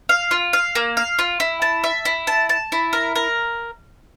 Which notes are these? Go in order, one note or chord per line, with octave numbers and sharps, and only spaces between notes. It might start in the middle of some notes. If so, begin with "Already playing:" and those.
F5
F4
F5
A#3
F5
F4
E4
A5
E5
E4
A5
A5
E4
A#4
A#4